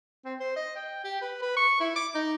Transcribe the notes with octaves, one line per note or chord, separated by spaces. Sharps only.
C4
C5
D#5
G5
G4
B4
B4
C#6
E4
D6
D#4